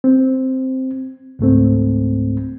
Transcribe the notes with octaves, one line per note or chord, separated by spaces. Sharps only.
C4
C#2 G#2 A3 C4